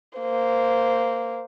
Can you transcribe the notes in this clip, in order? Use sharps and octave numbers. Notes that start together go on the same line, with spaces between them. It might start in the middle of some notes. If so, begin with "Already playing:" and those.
A#3 C5